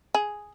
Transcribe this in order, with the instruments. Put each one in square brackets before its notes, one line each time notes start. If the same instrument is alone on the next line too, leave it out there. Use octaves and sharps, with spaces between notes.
[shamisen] G#4